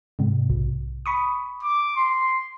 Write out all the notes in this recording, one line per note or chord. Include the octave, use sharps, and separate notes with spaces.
G#2 C3
B1
B5 C#6 D#6
D6
C6